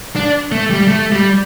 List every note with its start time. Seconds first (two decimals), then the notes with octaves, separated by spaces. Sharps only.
0.16 D4
0.52 A3
0.70 G3
0.88 A3
1.12 G3